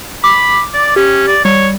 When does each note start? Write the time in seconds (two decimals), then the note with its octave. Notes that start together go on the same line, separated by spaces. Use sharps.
0.24 B5 D6
0.74 D5
0.96 C#4 G4
1.28 D5
1.45 G3 C#5